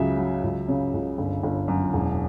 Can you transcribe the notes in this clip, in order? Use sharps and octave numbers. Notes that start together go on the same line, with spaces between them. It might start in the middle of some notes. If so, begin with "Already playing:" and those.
Already playing: C#2 C#3 F#3 E5
F#3
C#2
C#3
C#2
G1
G1
F#2
E1